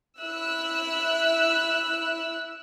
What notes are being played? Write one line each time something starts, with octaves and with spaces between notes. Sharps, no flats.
E4 E6 F#6